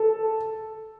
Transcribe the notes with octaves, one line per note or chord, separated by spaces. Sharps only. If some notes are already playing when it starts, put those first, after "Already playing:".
Already playing: A4